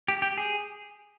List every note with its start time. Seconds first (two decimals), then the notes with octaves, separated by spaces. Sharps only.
0.08 G4
0.22 G4
0.38 G#4